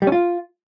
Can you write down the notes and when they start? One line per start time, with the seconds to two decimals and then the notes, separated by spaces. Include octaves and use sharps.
0.02 G3
0.07 C#4
0.12 F4